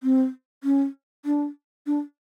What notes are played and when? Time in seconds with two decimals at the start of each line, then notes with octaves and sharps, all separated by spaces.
0.03 C4
0.64 C#4
1.25 D4
1.87 D4